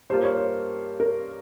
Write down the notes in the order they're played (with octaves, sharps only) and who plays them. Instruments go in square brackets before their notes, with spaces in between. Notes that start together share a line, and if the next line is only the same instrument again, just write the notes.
[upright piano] G2 G3 A#3 F4 [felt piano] C5
[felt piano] C#5
C5
A#4